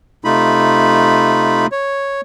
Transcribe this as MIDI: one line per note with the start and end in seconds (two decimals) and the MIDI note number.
0.25 1.67 48
0.25 1.67 57
0.25 1.67 63
0.25 1.67 65
0.25 1.67 83
1.72 2.21 73